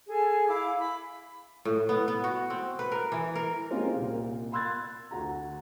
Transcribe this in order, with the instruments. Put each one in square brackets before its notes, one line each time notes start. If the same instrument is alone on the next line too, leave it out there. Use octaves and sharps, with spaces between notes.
[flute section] G#4 A4 G#5
E4 F5 D6
B5
[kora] A2
B3
B3
F#4
C4
B4
A#4
E3
A#4
[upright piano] G3 G#3 A#3 C4 C#4 F4
C2 A#2
B5 C6 E6 F#6 G#6 A6
D2 F#4 A#5